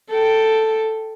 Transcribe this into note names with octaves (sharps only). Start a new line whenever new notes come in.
A4 G5